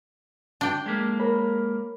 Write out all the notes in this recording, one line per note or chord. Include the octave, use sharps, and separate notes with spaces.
D4 G5
G#3 A#3 G#6 B6
A#4 C#5 B5